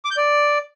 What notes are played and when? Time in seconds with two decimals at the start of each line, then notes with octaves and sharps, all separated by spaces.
0.05 D6
0.11 G6
0.17 D5